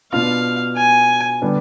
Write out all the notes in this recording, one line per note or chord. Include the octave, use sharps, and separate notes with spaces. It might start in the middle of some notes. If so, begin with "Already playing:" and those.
B2 B3 D4 F4 F5
G#5
D3 G3 B3 D4